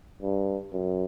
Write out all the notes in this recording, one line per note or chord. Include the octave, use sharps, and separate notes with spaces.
G2
F#2